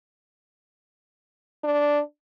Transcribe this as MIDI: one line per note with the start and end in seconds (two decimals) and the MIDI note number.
1.64 2.00 62